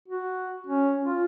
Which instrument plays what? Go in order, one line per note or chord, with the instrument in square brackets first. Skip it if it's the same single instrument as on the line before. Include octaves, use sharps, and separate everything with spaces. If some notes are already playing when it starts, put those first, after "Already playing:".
[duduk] F#4
C#4
F4